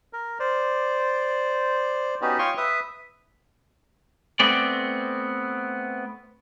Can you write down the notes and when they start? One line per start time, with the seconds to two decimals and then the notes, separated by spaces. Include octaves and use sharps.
0.13 A#4
0.40 C5 D5
2.22 B3 C#4 D#4 F#4 G4 B4
2.39 F4 C#5 G5 C6 C#6 D#6
2.57 B4 E5 D#6
4.40 A3 B3 C4 D5